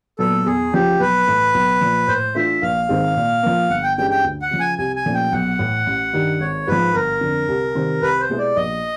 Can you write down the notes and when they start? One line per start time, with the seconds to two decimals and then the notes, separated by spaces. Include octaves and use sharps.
0.19 A#2 F#3 B3 A4
0.46 E2 G#4
0.72 C#3 F3 G4
1.00 B1 B4
1.27 A2 E3 A3
1.54 B1
1.81 A#2 F3
2.07 A2 C5
2.35 E3 A3 D4 F4 E5
2.62 A#1 F5
2.89 G#2 D#3 G#3 C4
3.17 A#2
3.43 F3 A#3
3.70 G1 F#5
3.83 G5
3.97 G2 E3 G#3 C#4 G5
4.11 G5
4.24 D2
4.42 F#5
4.51 C#3 F3
4.60 G#5
4.78 C2 G#5
4.96 G#5
5.06 A#2 F3 A3 C#4
5.14 G5
5.32 B1 F#5
5.59 A2 E3
5.86 A1
6.13 G2 D#3
6.40 G#1 C#5
6.67 G#2 F3 B4
6.94 G1 A#4
7.21 F2 D3
7.48 C2
7.75 C3 D#3 G3 C4
8.02 C2 B4
8.20 C5
8.30 B2 G#3 B3 E4
8.38 D5
8.56 A#1 D#5